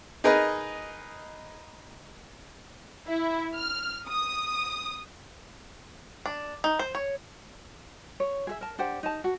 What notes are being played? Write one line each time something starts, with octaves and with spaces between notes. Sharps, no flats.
D#4 G#4 A#4 B4 D#5
E4
F6
D#6
D4
D#4
C5
C#5
C#5
G#4 A4 E5
A#4 A5
D4 G4 C5 F#5
D#4 A5
F#4